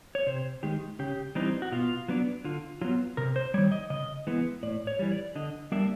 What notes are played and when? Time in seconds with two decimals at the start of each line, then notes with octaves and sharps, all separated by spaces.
0.15 C#5
0.27 C3 C5
0.63 D#3 G#3 G4
0.99 C#3 G4
1.35 E3 G3 C4 D#4
1.62 F#4
1.72 B2 F4
2.08 F#3 B3 D4
2.45 D3 F4
2.82 F#3 B3 F4
3.17 C3 A#4
3.36 C5
3.54 G3 C#5
3.58 D#3
3.72 D#5
3.90 C#3 D#5
4.27 E3 G#3 B3
4.63 A2 D5
4.87 C#5
4.99 E3 G3
5.12 D5
5.36 D3 D#5
5.72 G3 A#3 D4 E5